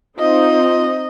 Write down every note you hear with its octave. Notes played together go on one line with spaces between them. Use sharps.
C4 D#4 F4 D#5